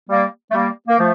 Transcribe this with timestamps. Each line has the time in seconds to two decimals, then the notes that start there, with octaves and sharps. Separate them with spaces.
0.10 G3 A#3
0.51 A3
0.54 G3 A#3
0.88 A#3
0.99 F3 A3